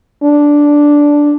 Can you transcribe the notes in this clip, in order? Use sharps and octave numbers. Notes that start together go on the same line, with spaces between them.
D4